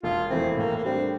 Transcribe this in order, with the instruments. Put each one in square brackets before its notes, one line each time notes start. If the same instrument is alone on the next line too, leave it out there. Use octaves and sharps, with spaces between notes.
[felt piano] E1 [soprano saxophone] F4
[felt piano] E2 E3 A3 E4 [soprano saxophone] C4
[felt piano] A2 [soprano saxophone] A#3
[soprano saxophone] A#3
[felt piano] G3 D4 [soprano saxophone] C4